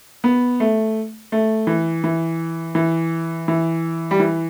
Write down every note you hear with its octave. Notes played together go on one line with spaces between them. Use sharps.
B3
A3
A3
E3
E3
E3
E3
G3
E3